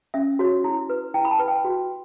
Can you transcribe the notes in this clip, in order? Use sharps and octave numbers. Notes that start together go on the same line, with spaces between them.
C#4 E5
F#4 C#5
E4
B4
E4 G5
B5
A5
B4
G5
F#4